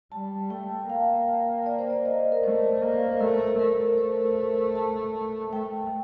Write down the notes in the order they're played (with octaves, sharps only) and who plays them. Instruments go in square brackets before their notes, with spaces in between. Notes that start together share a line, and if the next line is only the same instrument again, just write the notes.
[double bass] G3 [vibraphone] A5
[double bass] A3 [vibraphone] G5
[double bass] A#3 [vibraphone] F5
[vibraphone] D5
C5
D5
D#5
A#4
[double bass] A3 [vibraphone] C5
[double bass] A#3
[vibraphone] C5
[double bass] A3 [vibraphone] A#4
[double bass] A3 [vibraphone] A#4
[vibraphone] C5
A5
[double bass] A3 [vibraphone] G5